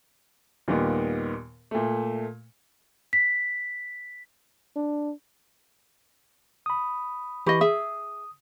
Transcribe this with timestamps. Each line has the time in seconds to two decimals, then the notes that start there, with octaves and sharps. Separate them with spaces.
0.68 D#2 A#2 D#3 G3 B3
1.71 A#2 A3
3.13 B6
4.76 D4
6.66 B5 D#6
7.46 E3 G4 D#5 B5 C#6
7.61 G#4 E5 D#6